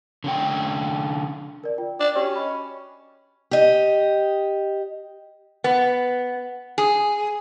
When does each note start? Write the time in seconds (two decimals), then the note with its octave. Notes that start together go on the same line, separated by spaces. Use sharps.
0.24 D3 C#4 G5
1.64 A#4 D5
1.78 F4 G5
2.00 D4
2.15 C#4 F#4 G4 G5
2.36 D#5 B5
3.51 G4 D#5
5.64 B3
6.78 G#4